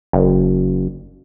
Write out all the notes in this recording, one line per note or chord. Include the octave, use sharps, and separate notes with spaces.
F#1